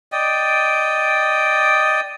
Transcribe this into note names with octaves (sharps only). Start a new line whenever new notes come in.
D5 D#5 G5